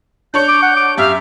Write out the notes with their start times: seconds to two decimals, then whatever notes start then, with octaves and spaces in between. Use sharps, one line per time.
0.34 D4 C#5 G6 C#7
0.48 D6
0.62 F#5
0.77 D6
0.98 F#2 G4 E5 F5